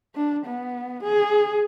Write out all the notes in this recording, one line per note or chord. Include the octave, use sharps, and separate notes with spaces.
D4
B3
G#4